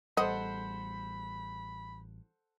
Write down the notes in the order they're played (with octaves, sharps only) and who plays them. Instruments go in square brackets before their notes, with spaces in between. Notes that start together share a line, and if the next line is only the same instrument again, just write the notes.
[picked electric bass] A1 G3 [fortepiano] A4 C5 F#5 [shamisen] D#5 [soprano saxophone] B5